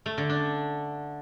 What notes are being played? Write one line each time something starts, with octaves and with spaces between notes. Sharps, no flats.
A3
D3
D4